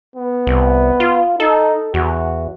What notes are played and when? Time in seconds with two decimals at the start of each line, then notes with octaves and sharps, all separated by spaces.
0.16 B3
0.47 C2
1.00 F4
1.40 D#4 A4
1.94 E2 F#4